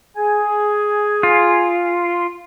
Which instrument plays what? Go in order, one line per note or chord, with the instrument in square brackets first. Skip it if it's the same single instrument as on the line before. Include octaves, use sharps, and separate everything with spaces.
[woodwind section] G#4 G#5
[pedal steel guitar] F4